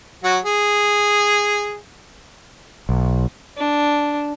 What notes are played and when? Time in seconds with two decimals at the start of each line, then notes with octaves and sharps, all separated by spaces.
0.24 F#3 F#4
0.44 G#4
2.89 B1
3.57 D4